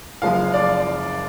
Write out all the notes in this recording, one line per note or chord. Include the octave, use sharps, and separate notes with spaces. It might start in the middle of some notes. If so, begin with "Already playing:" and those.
F#1 F#2 F3 G#3 F5
D5